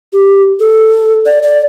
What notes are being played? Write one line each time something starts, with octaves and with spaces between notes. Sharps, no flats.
G4
A4
D5
D5